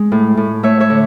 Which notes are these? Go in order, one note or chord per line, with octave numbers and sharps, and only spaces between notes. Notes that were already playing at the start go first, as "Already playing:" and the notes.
Already playing: G#3
A2
A2
A3 C#5 E5
C#5 E5
D3